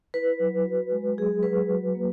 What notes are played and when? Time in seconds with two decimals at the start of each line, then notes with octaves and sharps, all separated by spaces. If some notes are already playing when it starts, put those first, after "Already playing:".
0.14 E4 B4
0.40 F#3
0.65 F#4
0.92 G#3
1.18 F#3 G#4
1.43 F#3 B4
1.70 F#4
1.95 A#3